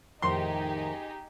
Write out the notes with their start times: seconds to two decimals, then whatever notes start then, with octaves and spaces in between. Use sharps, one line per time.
0.22 F2 A2 D#3 D#4 G4 G#4 C6